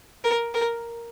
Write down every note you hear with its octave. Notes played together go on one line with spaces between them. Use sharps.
A#4
A#4